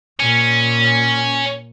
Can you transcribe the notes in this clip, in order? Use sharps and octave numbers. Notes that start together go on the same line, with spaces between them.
A#2 C#4